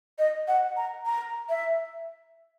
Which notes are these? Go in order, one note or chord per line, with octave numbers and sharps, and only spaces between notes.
D#5
F#5
A#5
A#5
E5